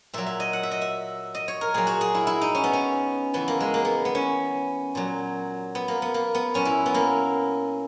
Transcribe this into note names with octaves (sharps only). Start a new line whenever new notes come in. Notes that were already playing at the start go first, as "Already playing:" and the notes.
A#2 F#3 E5
E5
D#5
F#5
E5
D#5
E5
D#5
C#5
A#4
A#2 F#3 G#4
F#4
G#4
E4
E4
D#4
C#4
B3
C#4
C#3 E3 B3
A#3
G#3
A#3
B3
B3
C#4
A#2 F#3
B3
A#3
B3
A#3
B3
A#2 F#3 C#4
E4
B3
A#3